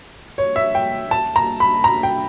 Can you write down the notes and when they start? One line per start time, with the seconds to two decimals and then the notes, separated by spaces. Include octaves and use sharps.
0.38 C#5
0.56 E5
0.75 G5
1.11 A5
1.36 A#5
1.60 B5
1.84 A#5
2.03 G5